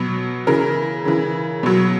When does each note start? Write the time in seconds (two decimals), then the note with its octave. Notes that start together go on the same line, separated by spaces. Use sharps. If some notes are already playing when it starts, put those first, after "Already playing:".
Already playing: B2 F#3
0.47 C#3 E3 A#4
1.05 C#3 E3
1.63 B2 F#3